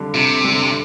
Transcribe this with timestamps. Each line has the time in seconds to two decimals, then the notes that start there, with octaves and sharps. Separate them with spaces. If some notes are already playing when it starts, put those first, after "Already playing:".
Already playing: F2 D3 G3
0.14 F2 C3
0.44 D3 G3